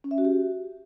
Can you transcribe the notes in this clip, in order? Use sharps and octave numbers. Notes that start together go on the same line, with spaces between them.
C#4
E5
F#4
G4